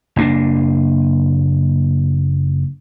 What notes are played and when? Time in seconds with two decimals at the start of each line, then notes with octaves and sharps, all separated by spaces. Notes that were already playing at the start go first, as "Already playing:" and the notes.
0.16 F#1 A#3 D4